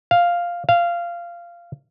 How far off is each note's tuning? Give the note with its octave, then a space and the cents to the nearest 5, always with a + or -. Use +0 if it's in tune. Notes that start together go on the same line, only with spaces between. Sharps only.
F5 +0
F5 -15